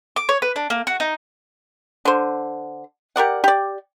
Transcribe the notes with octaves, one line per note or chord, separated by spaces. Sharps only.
D6
C#5
B4
D4
A#3
F#4
D#4
D3 C5
G4 A#4 D5 F#5
G4 D5